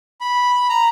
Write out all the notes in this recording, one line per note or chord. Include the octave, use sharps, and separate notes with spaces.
B5
A#5